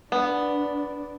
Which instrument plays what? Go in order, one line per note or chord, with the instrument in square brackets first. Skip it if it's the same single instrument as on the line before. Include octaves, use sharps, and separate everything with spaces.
[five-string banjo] B3 [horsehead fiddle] D4